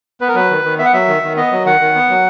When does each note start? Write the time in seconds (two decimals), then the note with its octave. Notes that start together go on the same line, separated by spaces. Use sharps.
0.21 B3 B4
0.28 A#4
0.35 F#3 B4
0.50 D#3
0.64 D#3
0.79 B3 E5
0.85 F#5
0.93 F#3 E5
1.08 D#3
1.22 D#3
1.36 B3 D#5
1.52 F#3
1.65 D#3 F#5
1.80 D#3
1.95 B3
2.09 F#3